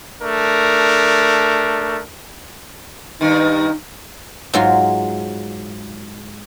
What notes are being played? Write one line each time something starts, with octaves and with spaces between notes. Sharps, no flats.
A3 D4 A#4
G2 D#3 D#4
G#2 F#3 F4